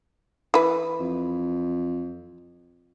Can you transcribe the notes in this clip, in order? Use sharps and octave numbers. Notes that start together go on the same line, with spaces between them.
E3 B4
F2